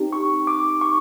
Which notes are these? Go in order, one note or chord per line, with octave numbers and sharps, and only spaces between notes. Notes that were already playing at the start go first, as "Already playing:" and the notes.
Already playing: C4 D#4 G4
C#6
D6
C#6